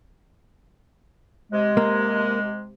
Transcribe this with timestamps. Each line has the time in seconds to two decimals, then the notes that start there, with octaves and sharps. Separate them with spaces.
1.52 C3 G#3
1.77 A#3